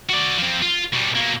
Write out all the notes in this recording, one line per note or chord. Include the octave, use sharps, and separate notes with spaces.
F#4 D5
F3 C4
F4
B2 G3
B2 A#3